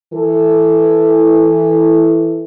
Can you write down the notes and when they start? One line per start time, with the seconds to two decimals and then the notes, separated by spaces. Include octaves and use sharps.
0.13 E3 A4